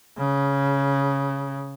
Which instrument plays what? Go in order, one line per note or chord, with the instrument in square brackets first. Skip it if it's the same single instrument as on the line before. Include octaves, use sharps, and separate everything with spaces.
[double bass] C#3